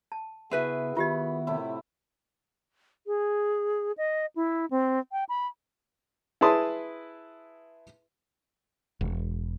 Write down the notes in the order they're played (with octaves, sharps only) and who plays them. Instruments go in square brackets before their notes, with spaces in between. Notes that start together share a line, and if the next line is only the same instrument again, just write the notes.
[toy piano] A5
[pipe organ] C#3 B3 [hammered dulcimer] E4 F#4 [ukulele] G#4 B4 E5
[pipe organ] D#3 B3 [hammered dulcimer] E4 F#5 B5 [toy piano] F4 G4 D#5
[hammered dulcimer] A2 C3 E4
[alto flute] G#4
D#5
E4
C4
G5
B5
[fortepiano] E4 G#4 B4 A5 C6 D#6
[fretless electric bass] E1